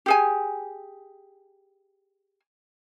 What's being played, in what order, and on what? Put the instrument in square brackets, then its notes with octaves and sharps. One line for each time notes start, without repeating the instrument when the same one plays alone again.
[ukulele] G4 G#4 G#5